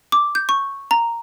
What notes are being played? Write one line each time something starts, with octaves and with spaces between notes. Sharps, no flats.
D6
G6
C#6
A#5